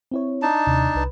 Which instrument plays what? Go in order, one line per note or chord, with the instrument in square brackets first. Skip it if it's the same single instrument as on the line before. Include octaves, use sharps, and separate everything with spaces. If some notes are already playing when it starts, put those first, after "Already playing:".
[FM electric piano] C4 E4 C#5
[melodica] D4 D#4 A5
[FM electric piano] D#2 C3
C2 B4